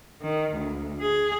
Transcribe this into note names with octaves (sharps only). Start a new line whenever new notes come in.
D#3
D2
G#4